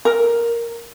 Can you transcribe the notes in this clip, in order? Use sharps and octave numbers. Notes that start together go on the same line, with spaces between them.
A#4